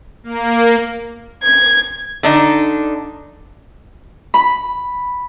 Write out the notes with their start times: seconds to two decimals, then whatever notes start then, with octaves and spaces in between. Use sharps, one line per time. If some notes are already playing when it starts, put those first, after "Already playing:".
0.24 A#3
1.42 G#6
2.23 D3 D4 D#4
4.34 B5